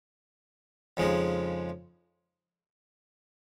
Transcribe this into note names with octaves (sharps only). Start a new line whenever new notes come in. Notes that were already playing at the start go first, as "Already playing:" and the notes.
F2 C#3 F3 G#3 D#4